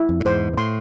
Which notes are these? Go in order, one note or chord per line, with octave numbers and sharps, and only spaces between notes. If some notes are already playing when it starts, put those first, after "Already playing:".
Already playing: E4
F2
A2
E2 G#2 C5
B2
A2 C6